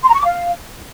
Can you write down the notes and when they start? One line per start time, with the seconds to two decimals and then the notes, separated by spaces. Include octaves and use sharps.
0.03 C6
0.08 A#5
0.14 C#6
0.19 D6
0.25 F5